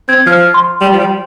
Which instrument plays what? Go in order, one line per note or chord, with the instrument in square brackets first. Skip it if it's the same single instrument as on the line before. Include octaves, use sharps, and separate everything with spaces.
[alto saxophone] C4 [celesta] G#6
[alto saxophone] F3 [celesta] F6
[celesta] C6
[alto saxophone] G3
F3
G3